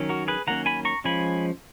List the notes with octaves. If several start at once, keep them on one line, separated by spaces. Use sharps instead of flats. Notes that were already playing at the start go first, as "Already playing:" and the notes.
Already playing: D#3 F#3 C#4
F#4 A#4
G#4 B4
D#3 F#3 A#3 C#4 F#5 A#5
G#5 B5
A#5 C#6
F3 G#3 C#4 G#5 B5